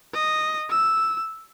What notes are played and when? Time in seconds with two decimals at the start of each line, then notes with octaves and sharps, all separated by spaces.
0.14 D#5
0.70 E6